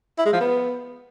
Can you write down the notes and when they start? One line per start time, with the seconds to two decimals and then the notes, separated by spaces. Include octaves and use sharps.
0.18 E4
0.26 G#3
0.33 F3
0.40 B3